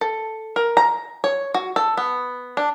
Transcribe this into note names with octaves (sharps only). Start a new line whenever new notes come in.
A4
A#4
A#5
C#5
F#4
A4
B3
D4